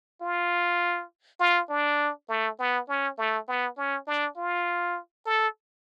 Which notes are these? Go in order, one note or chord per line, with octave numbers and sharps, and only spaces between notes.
F4
F4
D4
A3
B3
C#4
A3
B3
C#4
D4
F4
A4